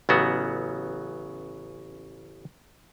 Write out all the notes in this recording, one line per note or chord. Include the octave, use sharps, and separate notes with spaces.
A1 C#3 F#3 B3 F#4